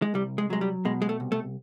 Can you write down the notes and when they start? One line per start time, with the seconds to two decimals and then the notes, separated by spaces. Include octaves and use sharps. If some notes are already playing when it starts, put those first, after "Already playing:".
0.02 G#3
0.14 C2 G3
0.38 G#3
0.50 F#3 G#3
0.61 G3
0.85 B2 G#3
1.02 G#3
1.09 A3
1.20 C2
1.32 A3